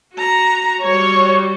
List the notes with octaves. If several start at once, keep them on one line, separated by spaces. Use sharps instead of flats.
F#4 A#5
G3 F#4 C#5